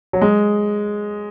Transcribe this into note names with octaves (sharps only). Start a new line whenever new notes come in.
F#3
G#3